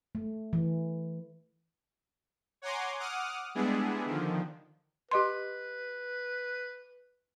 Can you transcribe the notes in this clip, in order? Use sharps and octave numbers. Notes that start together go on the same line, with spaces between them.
A3
E3
C#5 F#5 G#5 A#5 C6 D6
F#5 D6 D#6 F6
G3 G#3 B3 D4 E4 G#4
D3 D#3 F3
G4 B4 D#5 C6